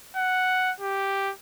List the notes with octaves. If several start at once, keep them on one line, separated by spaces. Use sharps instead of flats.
F#5
G4